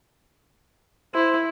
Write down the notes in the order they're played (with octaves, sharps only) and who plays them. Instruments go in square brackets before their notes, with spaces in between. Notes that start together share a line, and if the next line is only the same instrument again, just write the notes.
[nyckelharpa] E4 [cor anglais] C5